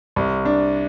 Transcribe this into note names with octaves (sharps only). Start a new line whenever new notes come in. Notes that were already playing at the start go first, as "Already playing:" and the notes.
C2
D4